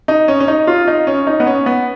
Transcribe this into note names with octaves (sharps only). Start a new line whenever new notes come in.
D#4
C#4
C#4
D#4
F4
D#4
C#4
D#4
B3
C#4
B3